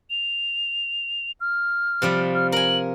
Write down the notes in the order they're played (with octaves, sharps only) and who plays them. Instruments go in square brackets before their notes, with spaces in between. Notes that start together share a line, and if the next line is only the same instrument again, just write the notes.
[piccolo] F7
F6
[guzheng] C3 F3 G3
[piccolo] F6
[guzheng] A#4 G#5 [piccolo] F#7